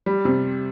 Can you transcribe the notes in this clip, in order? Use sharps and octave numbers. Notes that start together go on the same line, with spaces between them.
G3
C3